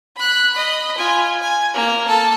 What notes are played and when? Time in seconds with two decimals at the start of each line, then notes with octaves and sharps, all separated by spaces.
0.17 B5 F#6
0.53 D#5 B5
0.97 F4 G#5
1.41 G#5
1.74 A#3 F6
2.06 A4 A5